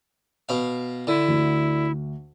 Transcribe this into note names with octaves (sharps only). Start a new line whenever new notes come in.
B2 F5
D3 E4
D2